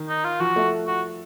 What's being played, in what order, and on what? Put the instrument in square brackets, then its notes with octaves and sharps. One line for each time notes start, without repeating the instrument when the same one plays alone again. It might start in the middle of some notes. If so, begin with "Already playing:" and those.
Already playing: [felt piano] D#3
[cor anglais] D#4
F4
[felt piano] F3 [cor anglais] F#4
[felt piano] A3
[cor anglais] F#4